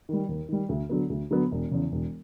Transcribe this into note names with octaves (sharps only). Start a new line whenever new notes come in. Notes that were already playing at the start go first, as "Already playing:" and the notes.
D#3 G3
D#2
D#3 G3
D2
D3 F#3 B3
D2
D3 F#3 B3
E1
E2 C#3
E1